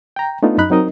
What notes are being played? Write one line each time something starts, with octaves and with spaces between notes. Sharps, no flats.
G5 A#5
A3 B3 D4 D#4 F4
F#2 D#4 B5 F#6
F#3 C4 D#4 A#4 D#5